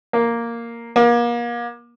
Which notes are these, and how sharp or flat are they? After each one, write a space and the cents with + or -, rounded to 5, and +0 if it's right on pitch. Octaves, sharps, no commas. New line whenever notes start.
A#3 +0
A#3 +35